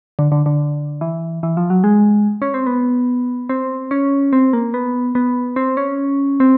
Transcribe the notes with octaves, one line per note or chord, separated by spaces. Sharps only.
D3
D3
D3
E3
E3
F3
F#3
G#3
C#4
C4
B3
C4
C#4
C4
A#3
B3
B3
C4
C#4
C4